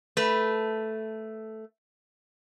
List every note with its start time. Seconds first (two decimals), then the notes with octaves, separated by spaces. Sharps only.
0.17 A3 B4